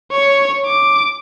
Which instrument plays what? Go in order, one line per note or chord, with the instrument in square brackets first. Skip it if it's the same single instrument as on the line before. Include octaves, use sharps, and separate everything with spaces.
[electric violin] C#5
D6